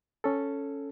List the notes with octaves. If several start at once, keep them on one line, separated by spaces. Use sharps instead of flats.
C#4 A4